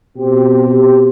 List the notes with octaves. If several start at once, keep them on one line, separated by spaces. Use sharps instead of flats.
B2 C4 G4